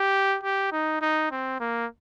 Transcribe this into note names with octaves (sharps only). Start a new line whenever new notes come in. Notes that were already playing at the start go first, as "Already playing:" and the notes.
Already playing: G4
G4
D#4
D#4
C4
A#3